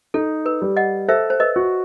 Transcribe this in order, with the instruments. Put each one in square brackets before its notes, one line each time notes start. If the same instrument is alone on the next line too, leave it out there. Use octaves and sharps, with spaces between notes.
[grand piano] D#4 [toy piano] A4
[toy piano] B4
[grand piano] G3
[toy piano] D#5 F#5
[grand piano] A4 [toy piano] C5 E5
[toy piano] C5
B4 D#5
[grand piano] F#4